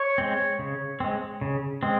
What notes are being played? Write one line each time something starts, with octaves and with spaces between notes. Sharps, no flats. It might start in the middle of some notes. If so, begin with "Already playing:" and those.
Already playing: C#5
G#3 C4
C#3
G#3 C4
C#3
G#3 C4